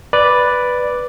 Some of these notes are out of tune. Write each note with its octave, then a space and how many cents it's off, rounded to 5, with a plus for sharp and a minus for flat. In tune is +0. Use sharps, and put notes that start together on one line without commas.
B4 +0 D5 +0